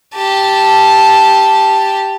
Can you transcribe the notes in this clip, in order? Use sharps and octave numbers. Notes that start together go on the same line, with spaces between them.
G4 A5